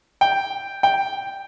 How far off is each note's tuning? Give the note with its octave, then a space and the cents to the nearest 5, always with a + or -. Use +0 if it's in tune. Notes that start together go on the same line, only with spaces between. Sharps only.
G5 +0
G5 +0